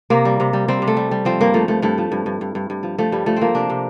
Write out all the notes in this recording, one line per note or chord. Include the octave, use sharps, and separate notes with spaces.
C3 A#3
G3
C3
G3
G3 C4
C3
A3
G3
G3
F3 C4
G2 A#3
F3 A3
G2 A3
G2 A3
F3
G2
G2
G2
G2
G2
F3
F3 A3
G2 G3
F3 A3
F3 A#3 C4
C3 D4
C3